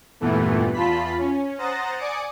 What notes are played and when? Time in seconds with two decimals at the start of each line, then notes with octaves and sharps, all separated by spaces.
0.20 E2 G2 A#2 E3 A3 B3
0.73 E2 F4 A5 B5 B6
1.18 C#4
1.58 C5 F#5 A#5 D#6 A6 A#6
1.98 D5 G#5 D6 D#6 C#7 D7